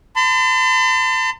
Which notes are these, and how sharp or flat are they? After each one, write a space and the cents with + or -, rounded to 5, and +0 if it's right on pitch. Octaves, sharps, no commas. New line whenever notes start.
A5 +35 C6 -45